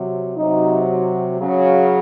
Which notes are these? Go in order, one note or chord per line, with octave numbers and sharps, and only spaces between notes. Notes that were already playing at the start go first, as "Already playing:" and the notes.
Already playing: C3 F#3
C3 F#3 D#4
C#3 F#3